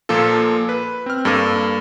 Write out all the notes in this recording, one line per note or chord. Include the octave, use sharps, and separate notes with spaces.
A#2 F3 A#3 F4 A4
B4
C4 F6
G2 A#3 A4 D6 D#7